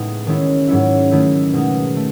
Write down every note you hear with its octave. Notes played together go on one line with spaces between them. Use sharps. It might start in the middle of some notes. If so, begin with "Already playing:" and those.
Already playing: A2 G#3 B3 D#4
D#3 G#3 C#4 E4
G#2 F#3 C#4 E4
D#3 A3 E4
B2 G#3 D#4
A3